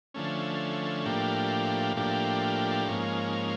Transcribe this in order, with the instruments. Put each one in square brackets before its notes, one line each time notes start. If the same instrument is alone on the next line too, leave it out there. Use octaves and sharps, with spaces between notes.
[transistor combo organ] D3 F3 A3 C#4
A2 F3 A#3 D4 G4
A2 F3 A#3 D4 G4
G#2 F3 A#3 C#4